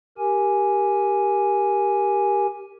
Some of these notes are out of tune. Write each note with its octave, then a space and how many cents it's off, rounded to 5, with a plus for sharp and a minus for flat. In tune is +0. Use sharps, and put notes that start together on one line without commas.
G4 +0 A#4 +0 G#5 +0